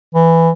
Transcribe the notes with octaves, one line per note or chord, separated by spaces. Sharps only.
E3